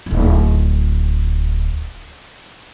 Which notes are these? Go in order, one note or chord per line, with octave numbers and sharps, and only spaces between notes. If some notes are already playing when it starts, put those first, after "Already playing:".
D1 G#1